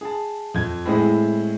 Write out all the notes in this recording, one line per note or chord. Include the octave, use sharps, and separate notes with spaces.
G#4 A5
F2 G#6
A2 G#3 C4 E4 G#4